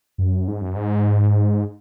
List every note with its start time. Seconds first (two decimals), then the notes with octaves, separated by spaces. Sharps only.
0.18 F#2
0.48 G#2
0.61 F#2
0.76 G#2